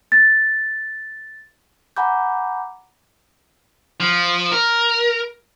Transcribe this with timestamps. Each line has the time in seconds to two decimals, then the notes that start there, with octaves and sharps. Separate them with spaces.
0.12 A6
1.96 F#5 G#5 A#5 B5 D6 G6
4.00 F3
4.52 A#4